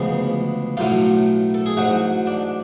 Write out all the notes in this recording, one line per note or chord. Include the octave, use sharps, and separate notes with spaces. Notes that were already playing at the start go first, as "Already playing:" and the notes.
Already playing: D2 C#3 F3 G#3 B3
B1 A2 F#3 A3 F4
A4
G#4
A1 G#2 F#3 F#4
D4